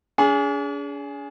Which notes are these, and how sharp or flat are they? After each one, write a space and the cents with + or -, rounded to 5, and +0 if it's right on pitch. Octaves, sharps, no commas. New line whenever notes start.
D4 -45 G#4 +0